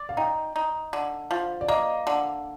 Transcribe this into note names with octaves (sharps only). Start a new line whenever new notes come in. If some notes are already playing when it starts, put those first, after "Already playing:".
Already playing: D5
F5
D#4 G5
D#4
D3
F3
D5
A#3 D#5
D3